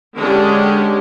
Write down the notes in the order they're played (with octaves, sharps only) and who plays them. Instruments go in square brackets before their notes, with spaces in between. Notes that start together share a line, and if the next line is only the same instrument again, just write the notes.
[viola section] D3 G#3 C#4 D4 G4